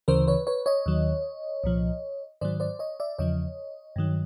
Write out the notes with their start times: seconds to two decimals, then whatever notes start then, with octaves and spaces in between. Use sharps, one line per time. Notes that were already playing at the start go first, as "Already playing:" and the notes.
0.08 D2 C#3 E3 A#4 C5
0.28 B4 C#5
0.47 B4 C#5
0.66 C#5 D#5
0.86 D#2 D#3 F#3
1.64 C2 A#2 F3
2.41 G#2 D#3 F#3 C5 D5
2.60 C5 D5
2.79 C#5 D#5
3.00 D5 E5
3.18 E2 C#3 F3 C#5 D#5
3.96 G2 D#3 F#3